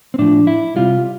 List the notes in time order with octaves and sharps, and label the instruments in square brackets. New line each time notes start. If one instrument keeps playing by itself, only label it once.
[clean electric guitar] C4
A2 F3 D4
E4
C3 G3 F4